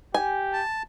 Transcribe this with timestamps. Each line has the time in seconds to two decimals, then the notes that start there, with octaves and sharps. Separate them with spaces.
0.14 G4 G#5
0.53 A5